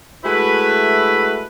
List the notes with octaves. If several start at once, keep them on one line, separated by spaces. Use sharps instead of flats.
G#3 A3 E4 F#4 B4